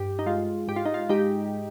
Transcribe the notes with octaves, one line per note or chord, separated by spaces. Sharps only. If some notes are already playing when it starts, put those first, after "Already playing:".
Already playing: G2 G4
D#4
G#3 F4
G#2 G4
F4
D#4
F4
G#3 D#4 G4